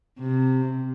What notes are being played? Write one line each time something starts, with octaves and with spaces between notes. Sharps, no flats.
C3